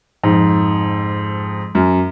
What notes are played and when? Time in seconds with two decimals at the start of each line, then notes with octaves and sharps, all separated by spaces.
0.24 F2 G#2
1.75 F#2